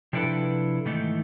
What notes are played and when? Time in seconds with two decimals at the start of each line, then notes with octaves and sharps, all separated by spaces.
0.13 C3 F3 D4 E4 A4 B4
0.85 G#2 D#3 E3 A3 D#4